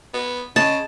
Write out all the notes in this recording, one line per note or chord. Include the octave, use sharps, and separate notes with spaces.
B3
C#3 D#5 A5